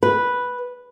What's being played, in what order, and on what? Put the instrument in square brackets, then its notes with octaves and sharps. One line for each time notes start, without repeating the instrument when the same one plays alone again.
[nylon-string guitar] B4